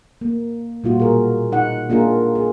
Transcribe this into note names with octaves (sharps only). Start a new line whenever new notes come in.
A#3
A#2 G3 F4 F#4
B2 G#4 A#4
D#4 F#5
A#3 D4 F4 G#4 A#4
G#4